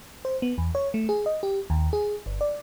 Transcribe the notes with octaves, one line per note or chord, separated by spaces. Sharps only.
C5
B3
E2
C#5
A3
G#4
D#5
G4
D#2
G#4
G1
D5